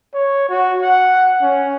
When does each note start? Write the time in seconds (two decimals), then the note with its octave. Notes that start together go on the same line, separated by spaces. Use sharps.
0.14 C#5
0.49 F#4
0.82 F#5
1.41 C#4